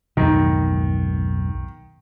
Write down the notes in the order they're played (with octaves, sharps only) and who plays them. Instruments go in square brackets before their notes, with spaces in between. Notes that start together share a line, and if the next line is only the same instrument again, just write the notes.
[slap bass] B1 F2 G#2 [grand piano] D#3